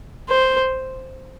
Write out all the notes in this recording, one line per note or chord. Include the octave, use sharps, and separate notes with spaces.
C5